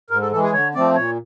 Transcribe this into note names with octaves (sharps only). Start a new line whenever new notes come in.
G#2 A#4
A4
E3 G#3 A4
G#4
D3 C#5
F3 A3 C4 D5
A#2 C#5